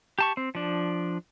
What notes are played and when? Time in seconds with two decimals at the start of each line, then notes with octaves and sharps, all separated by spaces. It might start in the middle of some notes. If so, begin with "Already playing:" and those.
0.19 G4 A5 C#6
0.37 C4
0.55 F3 D4